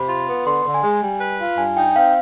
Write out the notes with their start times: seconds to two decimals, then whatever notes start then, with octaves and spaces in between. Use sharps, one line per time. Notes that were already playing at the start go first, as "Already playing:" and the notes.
Already playing: C3 B5
0.09 F4
0.28 B3
0.47 D3 C6
0.65 D3
0.74 G#5
0.84 G#3
1.03 G3
1.21 B4
1.39 F4
1.58 G2 G#5
1.76 D#4 G5
1.95 C4 F5